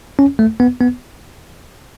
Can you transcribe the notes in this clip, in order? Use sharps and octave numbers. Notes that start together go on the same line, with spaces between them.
C#4
A3
B3
B3